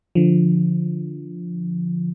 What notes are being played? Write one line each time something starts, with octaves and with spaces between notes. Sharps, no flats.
D3 F3